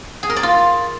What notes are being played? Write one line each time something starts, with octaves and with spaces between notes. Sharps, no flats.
G#4
A#4
D5
F4